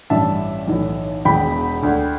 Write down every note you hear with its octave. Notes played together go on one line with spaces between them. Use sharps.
A1 G2 E3 E5 A5
B1 A2 E3
E1 E2 B2 G5 B5
D2 D3